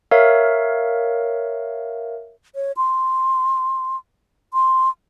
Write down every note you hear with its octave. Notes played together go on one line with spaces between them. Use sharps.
A#4 C#5 E5 F5
C#5
C6
C6